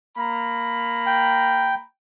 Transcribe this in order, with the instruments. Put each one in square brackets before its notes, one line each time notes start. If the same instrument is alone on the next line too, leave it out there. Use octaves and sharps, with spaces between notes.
[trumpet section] A#3 A#5 B5
[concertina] G5